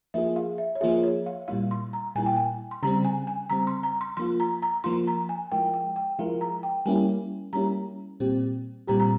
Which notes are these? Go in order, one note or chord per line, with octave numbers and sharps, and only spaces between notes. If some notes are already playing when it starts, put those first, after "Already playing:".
F3 A#3 F4 G#4 E5
F5
E5
C#5
F3 A#3 F4 G#4 E5
C#5
F5
A#2 G3 A#3 E4 F5
C6
A#5
A#2 G3 A#3 E4 G#5
G5
G#5
C6
C#3 G3 C4 A#5
G#5
G#5
C#3 G3 C4 A#5
C6
A#5
C6
F3 A#3 F4 C6
A#5
A#5
F3 A#3 F4 C6
A#5
G#5
F3 G#3 E4 A#4 G5
G5
G5
F3 G#3 E4 A#4 F5
A#5
G5
G3 A#3 C#4 E4 G4 G#5
G3 A#3 C#4 E4 G4 A#5
A#2 G3 C4 G4
A#2 G3 C4 G4 A#5
A#5